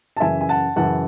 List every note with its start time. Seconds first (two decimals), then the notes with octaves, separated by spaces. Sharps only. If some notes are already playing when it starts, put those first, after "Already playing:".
0.17 A5
0.20 F#2 C#3 E3 E5 G#5
0.41 G#5
0.49 F#5 A5
0.76 F#2 C#3 E3 F#5 A5